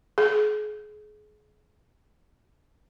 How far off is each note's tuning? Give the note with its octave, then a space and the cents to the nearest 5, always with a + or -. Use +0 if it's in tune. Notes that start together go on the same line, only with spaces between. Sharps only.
G#4 +30